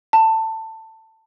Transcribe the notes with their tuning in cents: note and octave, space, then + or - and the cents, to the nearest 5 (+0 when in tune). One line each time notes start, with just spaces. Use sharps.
A5 +20